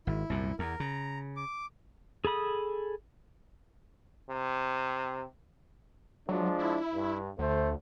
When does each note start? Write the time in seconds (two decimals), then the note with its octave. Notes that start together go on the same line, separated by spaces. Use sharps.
0.07 G#1 E4
0.30 C2 F#2 A#2
0.59 E2 A#4
0.80 C#3 A#5
1.36 D6
2.25 G#4 A4 B5 D#6
4.30 C3
6.29 F3 F#3 G#3 D4
6.59 E4
6.95 G2
7.39 D2 A3 C5